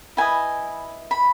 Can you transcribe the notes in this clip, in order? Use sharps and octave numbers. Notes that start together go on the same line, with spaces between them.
E4 B4 D#5 G#5
B5